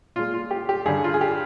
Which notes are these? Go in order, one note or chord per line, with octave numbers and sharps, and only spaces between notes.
A#2 G#3 F4
F4
G4
G4
G2 D3 G3 G#4
F4
G#4
G4